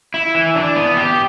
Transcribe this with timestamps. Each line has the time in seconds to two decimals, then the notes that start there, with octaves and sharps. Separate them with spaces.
0.14 E4
0.35 E3
0.55 D4
0.76 B3
0.97 G4